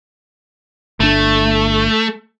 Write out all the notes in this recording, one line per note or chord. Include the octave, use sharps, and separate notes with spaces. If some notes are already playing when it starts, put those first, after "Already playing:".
G1 A3 D4